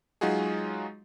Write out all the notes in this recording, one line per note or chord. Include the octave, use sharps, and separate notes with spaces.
F#3 G#3 D#4 F4 F#4 G#4